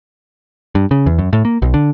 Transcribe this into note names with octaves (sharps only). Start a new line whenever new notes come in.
G2
C#3
E2
F#2
A2
A#3
B1
D3